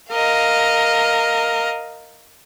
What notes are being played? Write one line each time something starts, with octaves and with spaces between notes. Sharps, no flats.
A#4 D#5 F5